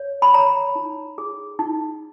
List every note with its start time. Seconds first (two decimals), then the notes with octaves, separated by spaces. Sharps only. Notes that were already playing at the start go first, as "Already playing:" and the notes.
Already playing: C#5
0.22 B5
0.34 C#5 A#5
0.75 D#4
1.18 G#4
1.59 D#4